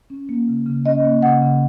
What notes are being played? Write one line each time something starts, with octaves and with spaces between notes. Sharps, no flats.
C#4
A#3
C#3
C#3
C#4 D#5
A#3
C#3 F#5
C#3